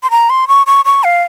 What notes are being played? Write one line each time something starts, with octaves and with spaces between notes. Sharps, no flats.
C6
A#5
C6
C#6
C#6
C#6
F5